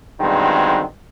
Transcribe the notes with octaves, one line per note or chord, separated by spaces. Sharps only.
E2 G2 D#3 F#3 G#3 C4